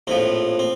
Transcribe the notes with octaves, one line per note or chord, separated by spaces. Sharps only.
A#1 A2 F3 C4
C4